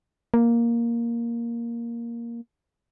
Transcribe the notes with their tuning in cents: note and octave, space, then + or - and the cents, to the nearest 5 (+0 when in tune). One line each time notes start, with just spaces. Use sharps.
A#3 +5